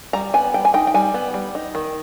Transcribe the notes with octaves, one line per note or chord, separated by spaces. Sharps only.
G3 A#5
B3 G#5
G3 G5
G#5
D#4 G5
G5
G3 G#5
B3
G3
D#4
D#3